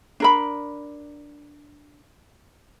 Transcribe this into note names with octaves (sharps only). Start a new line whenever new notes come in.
D4 A#4 B5